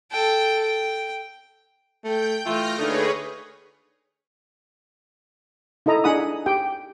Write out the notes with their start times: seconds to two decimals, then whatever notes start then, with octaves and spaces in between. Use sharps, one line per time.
0.12 A4 G5
0.62 G5
2.04 A3 G5 G6
2.46 E3 A3 F4 F6 G6 A#6
2.79 D3 A3 A#3 D#4 G#4 B4 C#5
5.86 D#4 E4 A4 D#5 A#5
6.04 D4 D#4 G#4 F#5 B5 D#6
6.46 G4 G5